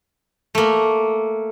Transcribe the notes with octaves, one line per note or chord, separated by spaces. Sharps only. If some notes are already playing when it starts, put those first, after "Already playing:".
A3 A#3